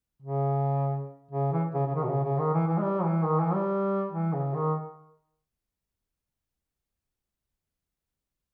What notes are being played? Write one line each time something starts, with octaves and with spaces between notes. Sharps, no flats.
C#3
C#3
E3
C#3
C#3
D#3
B2
C#3
C#3
D#3
E3
E3
G#3
G3
E3
D#3
E3
G3
E3
C#3
D#3